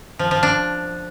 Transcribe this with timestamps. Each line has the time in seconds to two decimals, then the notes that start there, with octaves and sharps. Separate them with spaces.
0.19 F3
0.31 F3
0.43 D4